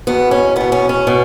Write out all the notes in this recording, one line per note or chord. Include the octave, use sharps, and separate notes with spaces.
E2 B2 B3
C#4
E2 B2 B3
C#4
C#4
B2